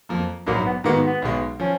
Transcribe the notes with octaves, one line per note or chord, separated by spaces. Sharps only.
F2 F3 A#3
A#1 G#2 F#3 A#3
B3
G#2 D#3 G#3 A#3 B3 F#4
B3
B1 B2 G#3
F3 C#4